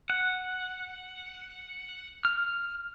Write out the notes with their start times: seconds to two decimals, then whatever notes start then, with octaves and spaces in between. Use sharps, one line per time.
0.10 F#5
2.25 F6